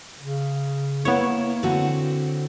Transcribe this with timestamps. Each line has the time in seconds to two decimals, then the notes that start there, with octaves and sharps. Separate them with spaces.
0.19 C#3
1.05 A#3 B3 E4 C#5
1.63 D3 C4 F#4